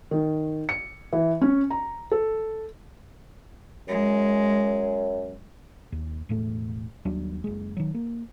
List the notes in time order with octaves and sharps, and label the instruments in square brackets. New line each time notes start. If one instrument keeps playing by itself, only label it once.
[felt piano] D#3
C#7
E3
C#4
A#5
A4
[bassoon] F#2 [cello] G#3
[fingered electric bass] D#2
E1 A2 A3
D#2 F#3 G3 D4
F#1 G#3
D#3 F#3
A#3